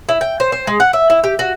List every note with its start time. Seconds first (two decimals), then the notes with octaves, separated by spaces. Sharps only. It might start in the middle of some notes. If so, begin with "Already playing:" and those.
0.09 E4
0.21 G5
0.40 C5
0.52 C5
0.67 G#3
0.80 F#5
0.93 E5
1.10 E4
1.24 G4
1.39 F#4